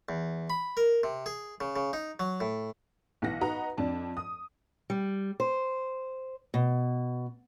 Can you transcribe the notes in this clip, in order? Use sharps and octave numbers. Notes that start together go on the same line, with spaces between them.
E2
B5
A#4
C3
G#4
C#3
C#3
D#4
F#3
A2
B1 E3 F#5 A#6
D#4 F#4 B4 D#5 F#5 A#5
F2 D4 A5
D#6
G3
C5
B2